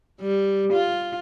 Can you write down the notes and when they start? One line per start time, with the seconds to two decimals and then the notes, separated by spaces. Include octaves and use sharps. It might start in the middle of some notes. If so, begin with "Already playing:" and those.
0.21 G3
0.73 F4